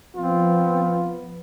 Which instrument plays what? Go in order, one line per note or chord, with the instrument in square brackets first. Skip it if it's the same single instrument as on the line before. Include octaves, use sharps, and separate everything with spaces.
[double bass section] F3 B3 [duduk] C4 [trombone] F4